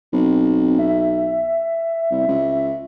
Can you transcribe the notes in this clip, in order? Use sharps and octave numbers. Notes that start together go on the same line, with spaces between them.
B1 C4
E5
C2
C#2